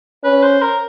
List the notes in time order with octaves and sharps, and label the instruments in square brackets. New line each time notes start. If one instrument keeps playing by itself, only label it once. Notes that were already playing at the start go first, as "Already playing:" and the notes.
[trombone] C#4 [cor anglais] B4
[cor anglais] C5
A#4